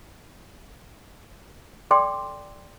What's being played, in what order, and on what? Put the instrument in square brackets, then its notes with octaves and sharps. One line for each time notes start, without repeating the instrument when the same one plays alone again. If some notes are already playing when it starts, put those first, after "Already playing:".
[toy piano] A4 D5 G5 C6 D6